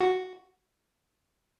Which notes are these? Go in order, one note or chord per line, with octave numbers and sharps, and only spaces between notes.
F#4